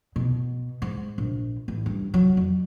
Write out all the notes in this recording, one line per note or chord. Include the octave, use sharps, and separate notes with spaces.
B2
G#2
A#1
A1
G2
F#3
F2